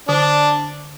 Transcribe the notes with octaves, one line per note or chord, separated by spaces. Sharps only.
D3 D4